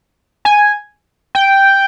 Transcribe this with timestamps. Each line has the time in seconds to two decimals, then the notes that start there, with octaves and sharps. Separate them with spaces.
0.45 G#5
1.35 G5